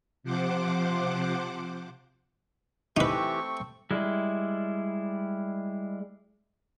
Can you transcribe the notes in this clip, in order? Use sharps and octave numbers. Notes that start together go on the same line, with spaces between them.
C3 F3 C5 F#5 D6
E3 A3 C4 D#4 G4 B4 C#6
G3 G#3 E4